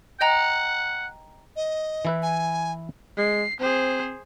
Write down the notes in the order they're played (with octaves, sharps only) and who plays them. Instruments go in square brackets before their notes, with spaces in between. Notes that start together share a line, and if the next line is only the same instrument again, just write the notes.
[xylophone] D#5 G5 A#5 [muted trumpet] F#5
[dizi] D#5
[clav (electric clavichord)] E3 E4 B4
[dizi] G#5
[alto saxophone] G#3 [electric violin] C7
[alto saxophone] C4 [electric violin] G#4 C5